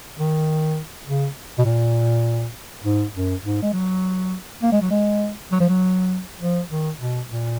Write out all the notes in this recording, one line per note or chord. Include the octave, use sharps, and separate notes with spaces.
D#3
C#3
B2
A#2
G#2
F#2
G#2
G#3
F#3
A#3
G#3
F#3
G#3
F#3
F3
F#3
F3
D#3
B2
A#2